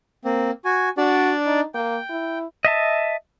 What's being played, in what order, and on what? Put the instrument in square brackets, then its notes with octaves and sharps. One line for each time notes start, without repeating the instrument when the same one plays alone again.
[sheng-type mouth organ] A#3 C4
F#4 G#5
[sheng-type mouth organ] D4 D5 [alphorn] F#4
[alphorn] D#4
[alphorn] A#3 [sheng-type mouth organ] G5
[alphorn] E4
[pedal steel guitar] D#5 E5 A5